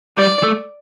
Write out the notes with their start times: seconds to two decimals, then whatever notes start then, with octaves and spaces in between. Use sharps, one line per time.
0.18 G3 D5
0.43 A3